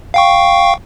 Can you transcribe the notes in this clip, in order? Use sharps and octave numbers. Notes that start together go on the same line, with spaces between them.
F5 G5 C#6